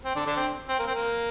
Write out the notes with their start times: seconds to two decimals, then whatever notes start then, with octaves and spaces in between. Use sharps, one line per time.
0.05 C4
0.16 D3 D4
0.26 D3 D4
0.37 C4
0.69 C4
0.79 A#3
0.87 C4
0.95 A#3